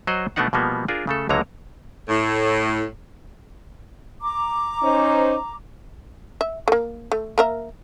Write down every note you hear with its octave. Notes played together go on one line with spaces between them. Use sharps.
F#3 C5 D#5 F#5
B2 A3 B3 D4 D#4 F#5
B2 F3 G3 A#3 B3
D4 F4 G#4 A#4
C#3 A3 A4
C#2 D3 F#3 A#3 C#5 A#5
A2
A#5 D6
C#4 D#4 C5
E5
A3 A#3
A3
A#3 A#4 E5